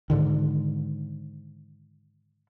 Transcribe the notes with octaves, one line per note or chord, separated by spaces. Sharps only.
G#2 D3 D#3